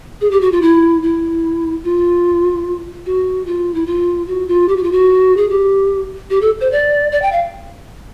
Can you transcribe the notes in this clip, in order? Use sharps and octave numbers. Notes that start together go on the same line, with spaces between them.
G#4
G4
F#4
F4
E4
E4
F4
F#4
F4
E4
F4
F#4
F4
G4
F#4
F4
F#4
G#4
G4
G4
A4
C5
D5
D5
G5
F5